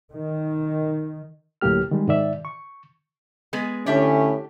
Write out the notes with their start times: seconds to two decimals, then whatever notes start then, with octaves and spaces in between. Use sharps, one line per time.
0.12 D#3
1.61 D2 A2 F#3 A#3 G4 F6
1.91 D#3 G3 G#3
2.08 G#2 D#3 D5 E5
2.45 C#6
3.53 G#3 B3 G#4
3.86 A2 D3 C#4 D4 G4 E5